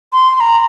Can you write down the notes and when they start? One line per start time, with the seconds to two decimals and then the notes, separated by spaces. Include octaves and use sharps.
0.13 C6
0.36 C6
0.40 A#5